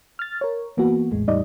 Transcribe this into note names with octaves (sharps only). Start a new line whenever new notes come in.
F6 A6
A#4 C#5
E3 A#3 B3 F#4
A#1 E2 A2 G#3
E2 A2 G3 D#4 D5 D#5